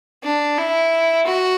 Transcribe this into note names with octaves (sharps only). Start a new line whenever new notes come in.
D4
E4
F#4